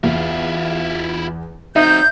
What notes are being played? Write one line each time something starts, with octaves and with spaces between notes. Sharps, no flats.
E2 E4 F4
F#3 C4 D#4 E5 G6